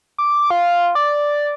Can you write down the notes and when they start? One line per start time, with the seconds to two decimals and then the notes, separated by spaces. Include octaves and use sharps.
0.18 D6
0.50 F4
0.95 D5